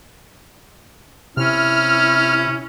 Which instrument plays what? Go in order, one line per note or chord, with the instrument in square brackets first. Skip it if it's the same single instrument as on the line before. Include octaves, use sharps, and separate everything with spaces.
[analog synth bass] C3 [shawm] C#4 [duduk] E4 [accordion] F6